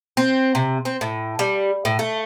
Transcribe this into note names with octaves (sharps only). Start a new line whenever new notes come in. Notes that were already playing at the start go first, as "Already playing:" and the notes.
C4
C3
C4
A2
G3
A2
A3